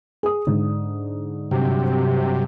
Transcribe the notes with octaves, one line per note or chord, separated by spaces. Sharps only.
G#4 D#6
G#2 D3
G2 C3 F#3 G4